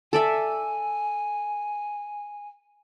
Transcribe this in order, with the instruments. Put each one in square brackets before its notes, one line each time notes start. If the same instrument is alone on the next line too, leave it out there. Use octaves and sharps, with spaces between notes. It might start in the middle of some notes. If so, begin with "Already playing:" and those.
[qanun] A4 D5 E5 [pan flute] G#5